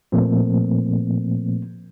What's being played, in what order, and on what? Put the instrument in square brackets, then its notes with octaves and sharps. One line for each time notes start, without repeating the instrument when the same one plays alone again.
[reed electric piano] A#2 F3 A3 A#3 C4